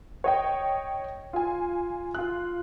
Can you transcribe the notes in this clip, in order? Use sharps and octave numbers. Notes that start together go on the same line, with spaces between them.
C#5 D#5 G5
F4 G#5
F4 F#6